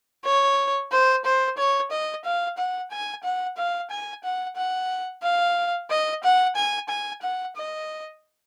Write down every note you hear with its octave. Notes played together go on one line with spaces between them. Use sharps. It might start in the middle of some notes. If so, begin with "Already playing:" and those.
C#5
C5
C5
C#5
D#5
F5
F#5
G#5
F#5
F5
G#5
F#5
F#5
F5
D#5
F#5
G#5
G#5
F#5
D#5